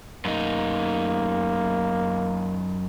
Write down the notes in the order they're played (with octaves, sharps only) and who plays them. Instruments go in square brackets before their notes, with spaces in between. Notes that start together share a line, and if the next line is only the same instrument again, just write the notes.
[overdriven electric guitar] F#2 D#4 [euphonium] A#3